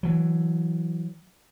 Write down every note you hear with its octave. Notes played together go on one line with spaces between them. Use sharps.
E3 F#3